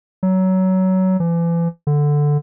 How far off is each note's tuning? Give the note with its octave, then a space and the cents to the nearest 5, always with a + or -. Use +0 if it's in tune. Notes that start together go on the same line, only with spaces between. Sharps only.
F#3 +20
E3 +40
D3 +0